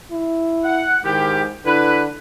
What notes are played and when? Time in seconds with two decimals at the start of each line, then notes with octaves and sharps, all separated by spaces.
0.11 E4
0.64 F#5
1.04 G#2 D#3 E4 G4
1.65 D3 E4 B4